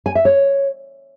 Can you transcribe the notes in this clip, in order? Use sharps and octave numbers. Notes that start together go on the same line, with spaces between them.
G#5
E5
C#5